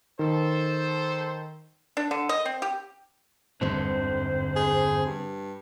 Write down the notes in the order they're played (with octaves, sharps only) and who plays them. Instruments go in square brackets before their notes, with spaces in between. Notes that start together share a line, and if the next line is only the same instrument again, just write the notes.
[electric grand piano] D#3 [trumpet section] A4 C5
[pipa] D4
D3
D#5
C4
G4
[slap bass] G1 E2 G#2 [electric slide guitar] D3 C4 [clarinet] C5
[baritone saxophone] G#4
G2